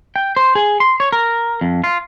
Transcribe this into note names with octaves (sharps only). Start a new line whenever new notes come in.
G5
C5
G#4
C6
C#5
A#4
F2
F4